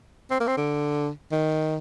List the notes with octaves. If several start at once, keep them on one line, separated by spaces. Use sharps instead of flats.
C4
A#3
C4
D3
D#3